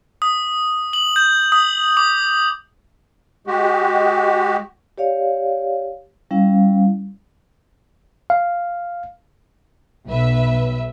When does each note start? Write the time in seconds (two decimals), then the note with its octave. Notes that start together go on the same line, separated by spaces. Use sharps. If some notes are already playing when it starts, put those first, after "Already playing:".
0.22 D#6
0.93 F#7
1.16 G6
1.52 D#6
1.97 D6
3.47 G#3 F#4 G4
4.98 G4 C#5 D5 F5
6.31 G3 C#4 E4 F5
8.30 F5
10.06 B1 B4 E5